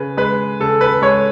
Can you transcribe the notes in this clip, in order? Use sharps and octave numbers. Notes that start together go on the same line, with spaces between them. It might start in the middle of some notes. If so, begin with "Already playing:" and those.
Already playing: C#3 B4
G#3 B4
C#3 A4
B4
G#3 C#5